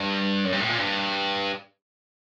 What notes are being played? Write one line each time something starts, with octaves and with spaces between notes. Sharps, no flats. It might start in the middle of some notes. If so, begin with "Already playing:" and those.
Already playing: G2
F#2
G2
A2
A#2
G2